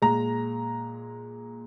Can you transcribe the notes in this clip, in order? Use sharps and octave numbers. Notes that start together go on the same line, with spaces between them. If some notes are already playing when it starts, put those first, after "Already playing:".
A#2 G#3 A#5